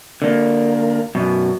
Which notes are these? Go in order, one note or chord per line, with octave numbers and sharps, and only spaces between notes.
D3 A#3
F#2 B2